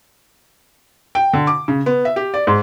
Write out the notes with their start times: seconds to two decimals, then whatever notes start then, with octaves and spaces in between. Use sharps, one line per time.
1.15 G5
1.33 D3
1.47 D6
1.68 C#3
1.86 B3
2.05 E5
2.16 G4
2.34 D5
2.47 G#2